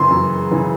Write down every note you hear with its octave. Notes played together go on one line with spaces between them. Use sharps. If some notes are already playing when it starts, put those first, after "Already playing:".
Already playing: F#2 C#3 E3 C6
F#2
C#3 E3